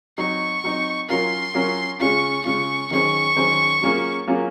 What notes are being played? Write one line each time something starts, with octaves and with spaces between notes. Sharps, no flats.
F#3 C4 D#4 C#6
F#3 C4 D#4
F#3 C#4 F4 A#4 C6
F#3 C#4 F4 A#4
C#3 G#3 C#4 F4 C#6
C#3 G#3 C#4 F4 C#6
D#3 F#3 C#4 G#4 C5 C#6
D#3 F#3 C#4 G#4 C5
F#3 A#3 C#4 F4 G#4
F#3 A#3 C#4 F4 G#4